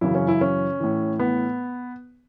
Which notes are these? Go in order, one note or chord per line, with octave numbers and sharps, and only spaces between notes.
F#2 C#3 E3 E4
C#4
E4
C#4
A2 E3
B3